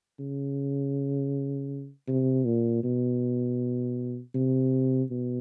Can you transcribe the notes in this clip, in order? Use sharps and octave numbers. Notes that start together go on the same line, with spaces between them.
C#3
C3
A#2
B2
C3
B2